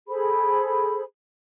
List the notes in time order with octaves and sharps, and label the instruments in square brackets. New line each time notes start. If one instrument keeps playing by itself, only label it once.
[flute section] G#4 A4 C5 B5